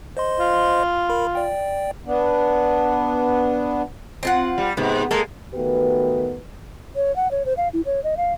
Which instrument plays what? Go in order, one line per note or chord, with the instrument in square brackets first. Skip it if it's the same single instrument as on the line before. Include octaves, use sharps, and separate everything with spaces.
[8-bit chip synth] C5 D#5 C6
[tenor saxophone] F4
[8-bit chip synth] A#4 B5
D5 G5
[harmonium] B3 D4
[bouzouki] C4 F4 F#5
[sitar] G3
[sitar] G#2 C3 [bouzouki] B3
[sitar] G#3 [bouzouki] A#3 A4 A#4
[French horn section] D#3 A3 B3 F#4 G4 B4
[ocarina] C#5
F#5
C#5
C5
F5
E4
C#5
D#5
F5